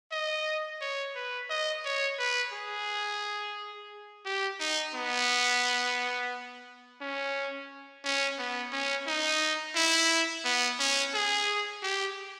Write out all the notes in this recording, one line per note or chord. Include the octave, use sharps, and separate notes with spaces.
D#5
C#5
B4
D#5
C#5
B4
G#4
G4
D#4
B3
C#4
C#4
B3
C#4
D#4
E4
B3
C#4
G#4
G4